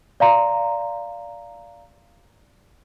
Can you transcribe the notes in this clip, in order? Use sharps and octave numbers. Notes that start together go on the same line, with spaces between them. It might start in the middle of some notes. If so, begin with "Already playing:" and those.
D5 F5 A#5 C6